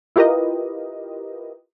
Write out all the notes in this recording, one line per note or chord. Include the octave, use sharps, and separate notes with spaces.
E4 F4 G4 A#4 B4 D#5